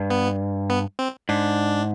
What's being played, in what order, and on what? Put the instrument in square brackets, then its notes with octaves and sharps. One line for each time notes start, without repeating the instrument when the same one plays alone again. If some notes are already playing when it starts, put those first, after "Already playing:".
Already playing: [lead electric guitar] G2
[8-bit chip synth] B3
B3
C4
[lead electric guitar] G#2 [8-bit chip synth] D4